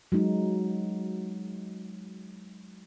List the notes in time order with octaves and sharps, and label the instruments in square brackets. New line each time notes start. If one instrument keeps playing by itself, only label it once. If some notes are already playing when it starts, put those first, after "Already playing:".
[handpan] F#3 G#3 D#4